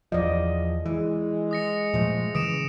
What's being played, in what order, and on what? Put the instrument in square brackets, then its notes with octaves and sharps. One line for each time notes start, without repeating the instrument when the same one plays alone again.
[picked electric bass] E2 F3 [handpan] D5 D#5
[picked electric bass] E3 [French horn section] G#3
[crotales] D#6 A#6 C#7
[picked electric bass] A#2 F3 A3
[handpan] C#3 [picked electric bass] E3 [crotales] D#6 D7 E7